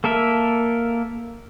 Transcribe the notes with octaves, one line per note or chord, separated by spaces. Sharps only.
A#3 A4 A#4 E5